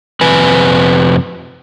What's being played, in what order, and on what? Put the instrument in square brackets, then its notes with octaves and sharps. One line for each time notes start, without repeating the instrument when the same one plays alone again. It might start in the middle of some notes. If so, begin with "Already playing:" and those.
[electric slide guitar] F2 C3 B4 G#5